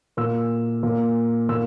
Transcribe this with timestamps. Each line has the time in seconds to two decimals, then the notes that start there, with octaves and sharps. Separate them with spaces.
0.17 A#2 E6
0.83 A#2
1.49 A#2 E6